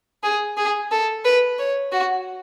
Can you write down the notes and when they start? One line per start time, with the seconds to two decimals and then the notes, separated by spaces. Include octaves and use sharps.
0.23 G#4
0.57 G#4
0.91 A4
1.24 B4
1.58 C#5
1.92 F#4